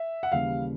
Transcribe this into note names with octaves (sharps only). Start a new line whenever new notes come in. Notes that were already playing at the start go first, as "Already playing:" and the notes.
Already playing: E5
F#5
D#2 C#3 E3 G3 F5